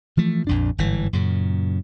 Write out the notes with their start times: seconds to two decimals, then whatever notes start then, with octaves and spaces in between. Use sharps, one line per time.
0.17 E3 F3 A3
0.47 A#1 F2 D4
0.78 G1 G#2 E3
1.13 F#2 A#2 C#3